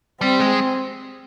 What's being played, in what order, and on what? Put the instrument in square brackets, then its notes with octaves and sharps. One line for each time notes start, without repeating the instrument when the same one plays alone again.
[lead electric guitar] G3 [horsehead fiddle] C4
[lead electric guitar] G#3